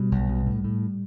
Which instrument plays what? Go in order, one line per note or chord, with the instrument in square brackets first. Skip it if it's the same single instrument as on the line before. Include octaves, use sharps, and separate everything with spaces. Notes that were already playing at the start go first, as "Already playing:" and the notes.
Already playing: [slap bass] B2 G3
B1
B2
A2
A2